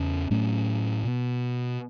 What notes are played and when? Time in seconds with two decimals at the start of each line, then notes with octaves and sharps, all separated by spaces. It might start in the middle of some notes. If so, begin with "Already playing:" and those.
Already playing: E2 C#3 C#4
0.31 A2 F#3 A3 C#4
1.04 B2 B3